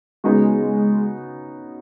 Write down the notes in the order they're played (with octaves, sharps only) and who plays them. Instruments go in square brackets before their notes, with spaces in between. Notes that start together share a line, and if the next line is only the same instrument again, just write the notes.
[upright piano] C#3 B3 D#4 F#4 [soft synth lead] G#3